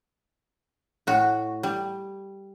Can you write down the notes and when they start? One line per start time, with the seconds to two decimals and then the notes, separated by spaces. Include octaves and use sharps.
1.07 A2 F#4
1.63 G3